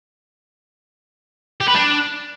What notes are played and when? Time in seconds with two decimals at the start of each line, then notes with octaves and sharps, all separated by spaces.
1.61 G4
1.68 B4
1.75 D4